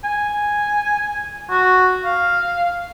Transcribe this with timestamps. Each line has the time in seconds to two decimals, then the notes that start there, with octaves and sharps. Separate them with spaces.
0.04 G#5
1.51 F#4
2.05 F5